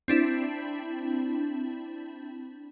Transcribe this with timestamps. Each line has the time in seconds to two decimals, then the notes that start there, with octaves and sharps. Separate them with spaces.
0.08 C4 D4 E4